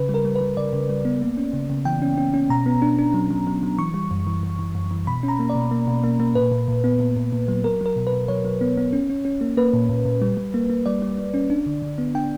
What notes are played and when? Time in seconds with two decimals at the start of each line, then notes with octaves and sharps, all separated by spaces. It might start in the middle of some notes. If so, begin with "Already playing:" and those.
Already playing: C#3 B4
0.09 G3
0.14 A#4
0.25 G3
0.36 B4
0.41 G3
0.57 C#3 D5
0.73 C#3
0.89 G3
1.05 B3
1.22 A#3
1.37 C#4
1.53 C#3
1.70 C#3
1.85 E3 G5
2.02 C#4
2.18 C#4
2.34 C#4
2.50 B2 A#5
2.66 B3
2.82 D4
2.99 D4
3.14 F#3
3.31 F#3
3.47 F#3
3.63 F#3
3.79 E3 C#6
3.94 G3
4.11 F#2
4.27 E3
4.43 F#2
4.59 E3
4.75 F#2
4.91 E3
5.07 B2 B5
5.23 C#4
5.28 A#5
5.39 A#3
5.50 D5
5.55 B2
5.71 A#3
5.88 B2
6.04 A#3
6.20 A#3
6.35 A#2 B4
6.52 A#2
6.68 A#2
6.84 B3
7.00 A#2
7.17 A#2
7.33 A#2
7.48 F#3
7.64 F#3 A#4
7.81 F#3 A#4
7.96 B2
8.07 B4
8.13 B2
8.28 F#3 C#5
8.45 F#3
8.61 B3
8.78 B3
8.93 C#4
9.10 C#4
9.25 C#4
9.41 A#3
9.57 A#3 B4
9.73 A#2
9.89 A#2
10.05 A#2
10.22 G3
10.37 G3
10.54 A#3
10.70 A#3
10.86 G3 D5
11.02 G3
11.18 G3
11.34 C#4
11.50 D4
11.66 D3
11.82 D3
11.98 B3
12.15 D4 G5